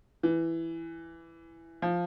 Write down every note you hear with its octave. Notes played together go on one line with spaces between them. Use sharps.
E3
F3